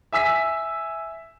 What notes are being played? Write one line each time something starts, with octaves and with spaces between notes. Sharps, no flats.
E5 G#5 E6 B6